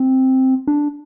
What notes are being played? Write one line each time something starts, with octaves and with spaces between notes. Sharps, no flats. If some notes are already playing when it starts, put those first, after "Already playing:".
Already playing: C4
D4